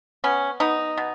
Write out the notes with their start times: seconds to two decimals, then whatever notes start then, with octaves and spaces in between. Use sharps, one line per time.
0.24 B3 C#4
0.60 B3 D#4
0.97 B2